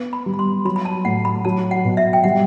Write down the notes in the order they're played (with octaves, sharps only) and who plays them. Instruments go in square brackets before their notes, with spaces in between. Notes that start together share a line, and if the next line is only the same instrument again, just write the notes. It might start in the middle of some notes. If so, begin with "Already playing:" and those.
Already playing: [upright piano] B3
[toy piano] B5
[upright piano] G3
[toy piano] B5
C6
[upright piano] F#3 [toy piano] B5
[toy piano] B5
A5
[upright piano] A2 [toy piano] F#5
[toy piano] B5
[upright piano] F#3 [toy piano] A5
[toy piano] F#5
[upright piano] B2
[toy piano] E5
G5
[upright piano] G3 [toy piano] F#5